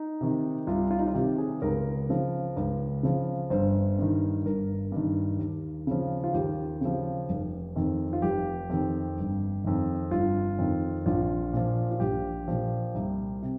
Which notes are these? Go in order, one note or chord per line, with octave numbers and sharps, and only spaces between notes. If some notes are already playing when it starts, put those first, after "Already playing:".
Already playing: D#4
C3 D#3
C2 F4
F4
D#4
F4
C3 D#3 G4
G#4
C#2 A#4
C#3 F3
C#2
C#3 F3
G1 C5
G2 D#3
G1 A#4
G2 D#3
D#2
C#3 F3
F4
D#2 G4
C#3 F3
F1
F2 D#3
F4
F1 G4
F2 D#3
G1
F2 D#3
G1 F4
F2 D#3
A#1 F4
A#2 F3
F4
A#1 G4
A#2 F3
C2
C3